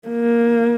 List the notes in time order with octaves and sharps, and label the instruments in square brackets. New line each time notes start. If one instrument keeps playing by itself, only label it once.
[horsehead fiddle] A#3